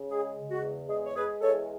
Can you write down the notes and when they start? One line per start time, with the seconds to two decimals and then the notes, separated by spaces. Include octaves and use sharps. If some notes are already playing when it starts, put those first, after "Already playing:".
Already playing: C#3
0.09 G#3 G#4
0.35 C#3
0.49 F#4
0.61 E2
0.88 G#3 G#4
1.05 C#5
1.15 G#3 G#4 B4
1.41 E2 A4 C#5